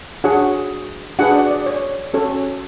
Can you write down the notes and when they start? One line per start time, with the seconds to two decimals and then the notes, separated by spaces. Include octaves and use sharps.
0.24 D4 F#4 G#4 C#5 F#5
1.19 D4 F#4 G#4 B4 F#5
1.35 D5
1.51 D5
1.66 C#5
2.14 C#4 F#4 A4 C#5